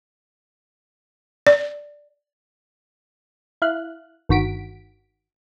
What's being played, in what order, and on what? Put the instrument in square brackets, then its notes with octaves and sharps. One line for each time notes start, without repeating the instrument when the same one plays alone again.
[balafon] D5
[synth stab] E4 F5 F#6
G1 D#3 F#4 B6 D7